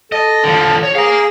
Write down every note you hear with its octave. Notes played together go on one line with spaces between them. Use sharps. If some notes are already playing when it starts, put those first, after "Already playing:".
A4 D#5
D3 F3
C#5
G#4 F5 A#5